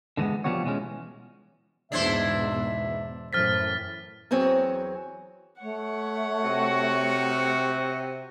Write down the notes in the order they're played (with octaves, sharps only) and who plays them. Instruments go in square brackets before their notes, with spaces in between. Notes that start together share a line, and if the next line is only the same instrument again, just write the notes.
[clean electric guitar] D3 E3 F#3 G#3 B3
F3 G3 G#3 B3 F#4 C#5
B2 E3 G#3 C#4
[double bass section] E2 G#2 B2 [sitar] D4 E4 C5 [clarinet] E5
[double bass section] F#2 A2 E3 [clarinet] C5 [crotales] F6 A6 B6
[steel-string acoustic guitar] E2 F#3 C4 C#5 G#5
[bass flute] A3 [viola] C#5 F#5
[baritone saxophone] C3 [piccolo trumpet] F#4